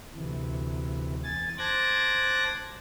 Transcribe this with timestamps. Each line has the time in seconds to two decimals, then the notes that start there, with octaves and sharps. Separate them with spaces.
0.14 D2 C3 E3
1.24 E2 G#5 A6
1.58 C5 A5 D6 F#6 G#6 A#6